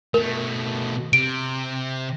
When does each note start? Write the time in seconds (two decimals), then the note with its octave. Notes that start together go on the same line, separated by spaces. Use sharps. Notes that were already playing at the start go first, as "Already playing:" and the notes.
0.14 B2 A3 A#4
1.13 C3 D7